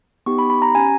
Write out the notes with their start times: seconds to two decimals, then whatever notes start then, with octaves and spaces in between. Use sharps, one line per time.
0.26 B3 D#4 G4 C#6
0.39 B5
0.50 B5
0.62 A#5
0.75 C#4 G4 G#5